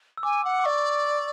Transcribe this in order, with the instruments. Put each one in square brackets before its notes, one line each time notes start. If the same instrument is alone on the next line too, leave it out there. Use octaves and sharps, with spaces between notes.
[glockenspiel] E6
[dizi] G#5 [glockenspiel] D6
[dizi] F#5
[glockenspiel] D6
[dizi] D5 [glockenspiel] C#6